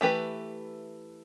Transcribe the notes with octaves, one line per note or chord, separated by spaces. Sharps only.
E3 A3 G4 B4